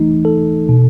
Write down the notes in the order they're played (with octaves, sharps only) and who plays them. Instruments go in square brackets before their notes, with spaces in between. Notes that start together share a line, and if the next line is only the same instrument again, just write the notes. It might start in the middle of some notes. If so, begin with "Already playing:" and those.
Already playing: [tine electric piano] E3 A3 D#4
A4
B2